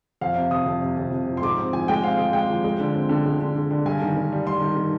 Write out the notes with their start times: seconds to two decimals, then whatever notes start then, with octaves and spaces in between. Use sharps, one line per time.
0.21 F2 F5
0.35 C3
0.51 F2 D#6
0.66 F2
0.81 C3
0.97 F2
1.11 F2
1.27 F3
1.37 C6
1.42 G#2 D6
1.58 C4
1.73 F3 G#5
1.88 G#3 G5
2.04 C4 F5
2.18 G#3
2.33 G#3 G5
2.50 F3
2.64 G#3
2.80 D3
2.95 C4
3.09 D3
3.26 G#3
3.41 D3
3.55 D3
3.71 D3
3.86 G2 G#5
4.02 D#3
4.17 G2
4.32 G3
4.46 G3 C6
4.61 D#3
4.77 D#3